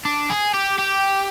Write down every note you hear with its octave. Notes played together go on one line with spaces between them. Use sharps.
D4
G#4
G4
G4